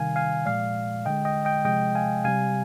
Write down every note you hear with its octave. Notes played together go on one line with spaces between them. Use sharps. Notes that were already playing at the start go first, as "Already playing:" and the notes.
Already playing: C3 D#3 G3 F5 G#5
F5 G#5
A#2 F3 G#3 D5 F5
D3 G#3 D#5 G5
D#5 G5
D#5 G5
C3 F3 G#3 D#5 G5
F5 G#5
C3 G3 F5 G#5